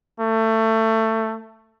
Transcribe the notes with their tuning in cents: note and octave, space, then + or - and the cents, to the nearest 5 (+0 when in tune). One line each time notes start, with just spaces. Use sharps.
A3 +20